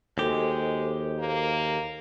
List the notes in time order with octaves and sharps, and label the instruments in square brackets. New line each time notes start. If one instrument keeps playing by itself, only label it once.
[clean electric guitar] D#2 G4 [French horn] G#3 [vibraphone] F#4 A4 C5
[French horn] A#3